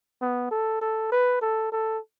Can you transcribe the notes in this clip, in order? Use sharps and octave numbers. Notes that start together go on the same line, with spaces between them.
B3
A4
A4
B4
A4
A4